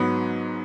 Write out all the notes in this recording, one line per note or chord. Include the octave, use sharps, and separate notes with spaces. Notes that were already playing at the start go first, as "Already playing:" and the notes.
Already playing: G#2 F#3 B3